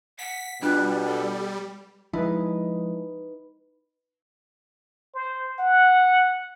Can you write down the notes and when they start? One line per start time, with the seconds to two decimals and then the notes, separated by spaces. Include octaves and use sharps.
0.19 F#5 B6
0.62 B2 G3 D4 F4 F#6
1.06 A4
2.13 F3 G#3 D#4 E4 B4
5.15 C5
5.59 F#5